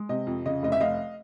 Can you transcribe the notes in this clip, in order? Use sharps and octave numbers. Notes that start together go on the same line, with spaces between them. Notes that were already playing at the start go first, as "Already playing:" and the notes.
Already playing: G#3
C3 D#5
F2
C#3 D#5
F1 D#5
E5
F1 D#5 F5